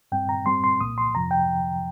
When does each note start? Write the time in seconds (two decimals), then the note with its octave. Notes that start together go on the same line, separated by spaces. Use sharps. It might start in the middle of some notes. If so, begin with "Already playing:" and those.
0.12 G2 G3 C4 G5
0.29 A#5
0.46 G2 G3 C4 C6
0.64 C6
0.81 C2 A#2 A#3 D#6
0.98 C6
1.14 F2 C3 F3 A#5
1.31 G5